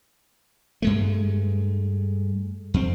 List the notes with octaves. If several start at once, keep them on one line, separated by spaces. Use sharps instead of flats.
G2 G#3 A3
F2 C4